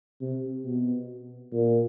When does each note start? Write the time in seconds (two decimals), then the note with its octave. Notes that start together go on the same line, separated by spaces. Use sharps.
0.21 C3
0.65 B2
1.53 A#2